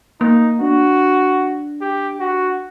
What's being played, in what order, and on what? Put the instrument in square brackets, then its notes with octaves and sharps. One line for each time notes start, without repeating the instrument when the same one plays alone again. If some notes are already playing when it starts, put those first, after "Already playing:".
[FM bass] A#3 [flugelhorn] D#4
[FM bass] D4 [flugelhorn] F#4
[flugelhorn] G4
F#4